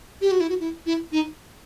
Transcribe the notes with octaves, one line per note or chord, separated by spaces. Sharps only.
G4
F#4
E4
F#4
E4
E4
D#4